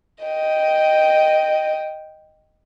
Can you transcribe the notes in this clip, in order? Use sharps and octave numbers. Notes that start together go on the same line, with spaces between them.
D#5 G5